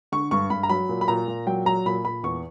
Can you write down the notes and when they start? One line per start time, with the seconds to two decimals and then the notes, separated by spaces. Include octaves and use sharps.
0.12 D3 C#6
0.31 G2 C#6
0.50 G2 B5
0.63 A#5
0.69 F#3 B5
0.89 A#2
1.01 B5
1.08 A#2 A#5
1.28 A#2
1.47 F#3 G5
1.66 F#3 A#5
1.86 A#2 B5
2.05 A#2 B5
2.23 E2 C#6